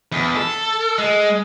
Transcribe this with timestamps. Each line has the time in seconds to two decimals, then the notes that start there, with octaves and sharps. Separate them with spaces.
0.12 E2
0.36 A4
0.98 G#3